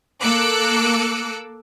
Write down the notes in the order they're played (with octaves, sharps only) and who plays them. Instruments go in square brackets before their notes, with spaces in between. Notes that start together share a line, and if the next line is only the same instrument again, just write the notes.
[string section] A#3 A4 D6 E6 F#6 C#7